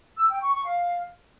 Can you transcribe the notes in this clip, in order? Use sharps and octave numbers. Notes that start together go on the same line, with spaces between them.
E6
G5
C#6
C#6
F5